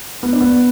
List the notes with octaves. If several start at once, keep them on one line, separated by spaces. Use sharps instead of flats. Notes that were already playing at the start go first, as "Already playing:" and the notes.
B3
D4
B3